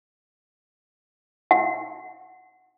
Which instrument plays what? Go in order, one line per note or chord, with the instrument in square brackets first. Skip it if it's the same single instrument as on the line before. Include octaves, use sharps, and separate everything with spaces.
[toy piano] F#5